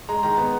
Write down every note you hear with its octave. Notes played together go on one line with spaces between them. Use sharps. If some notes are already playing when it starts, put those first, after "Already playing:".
G#3 A#5
D#3 A#5
B3